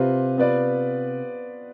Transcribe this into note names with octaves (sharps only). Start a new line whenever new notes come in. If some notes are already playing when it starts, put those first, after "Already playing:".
Already playing: C3 C4 F4 B4
B3 F4 B4 D5